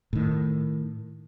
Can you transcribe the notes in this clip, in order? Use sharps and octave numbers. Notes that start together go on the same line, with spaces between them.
A2 D#3